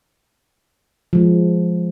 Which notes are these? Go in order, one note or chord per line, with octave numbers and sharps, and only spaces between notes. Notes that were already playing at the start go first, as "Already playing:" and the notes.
F3 G#3